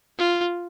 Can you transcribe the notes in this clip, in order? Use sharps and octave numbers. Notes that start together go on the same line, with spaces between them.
F4